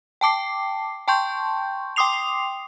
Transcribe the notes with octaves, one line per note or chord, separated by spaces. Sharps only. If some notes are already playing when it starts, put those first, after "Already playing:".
G5 A5 D6 C7
G5 A5 C6 C#6 G6
G5 C6 D6 D#6 C7 F7